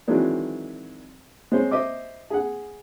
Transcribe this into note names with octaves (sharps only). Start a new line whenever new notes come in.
D#3 E3 F#3 G#3 C4 D4
G#3 C4 C5 C#5
C5 D#5 E5 D6
G#4 F#5